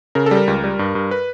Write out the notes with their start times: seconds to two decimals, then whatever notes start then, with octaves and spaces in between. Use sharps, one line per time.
0.15 C#3 A#4
0.26 G3 A4
0.37 A#4
0.48 C#2
0.64 G3
0.79 G2
0.95 G2
1.11 B4